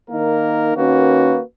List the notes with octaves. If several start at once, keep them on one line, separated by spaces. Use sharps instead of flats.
D#3 A#3 D#4 A#4
D#3 A#3 C#4 F#4 B4